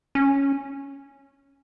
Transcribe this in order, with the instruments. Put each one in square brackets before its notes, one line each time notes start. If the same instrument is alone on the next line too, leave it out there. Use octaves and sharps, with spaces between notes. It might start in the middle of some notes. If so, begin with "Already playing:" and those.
[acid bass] C#4